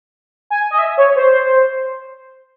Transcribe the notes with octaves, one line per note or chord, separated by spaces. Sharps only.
G#5
D#5
E5
C#5
C5